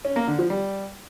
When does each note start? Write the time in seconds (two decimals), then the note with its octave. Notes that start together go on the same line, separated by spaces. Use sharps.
0.05 C#4
0.16 A#3
0.27 D3
0.39 F3
0.50 G3